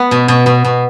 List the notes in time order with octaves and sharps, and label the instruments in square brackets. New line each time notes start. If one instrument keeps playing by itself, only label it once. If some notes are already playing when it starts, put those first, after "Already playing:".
Already playing: [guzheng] B3 B4
B2
B2
B2
B2